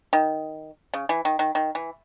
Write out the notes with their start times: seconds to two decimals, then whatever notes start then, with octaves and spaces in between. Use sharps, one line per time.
0.13 D#3
0.94 C#3
1.09 E3
1.25 D#3
1.39 D#3
1.55 D#3
1.75 E3